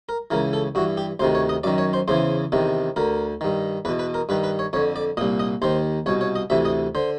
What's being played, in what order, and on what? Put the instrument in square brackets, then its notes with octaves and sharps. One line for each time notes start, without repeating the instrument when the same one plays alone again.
[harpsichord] A#4
C#2 C#3 E3 A#4
A4
G2 E3 F#4
G4
D2 C3 D#3 C5
C#5
D#5
F#2 D#3 D5
C#5
C5
E2 C#3 E3 C5
E2 C3 D#3
D2 D3 A#4
G2 D#3
E2 B4
B2
B4
A#4
G2 D#3 B4
B4
C#5
F2 C#5
D3
D5
A#2 D#5
C2
D#5
D#2 D#3 C5
C2 B2 C#5
C#5
D#5
D2 C3 E3 E5
D#5
D3 C5